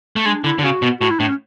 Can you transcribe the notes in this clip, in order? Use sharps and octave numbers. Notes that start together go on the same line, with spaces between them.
A3
G#3 D4
D3 E4
D3
C#3 F#4
B2
A2 F#4
E4
A2 D4
C#4